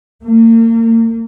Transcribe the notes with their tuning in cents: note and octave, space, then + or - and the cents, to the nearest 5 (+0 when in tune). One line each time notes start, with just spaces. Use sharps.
A#3 -40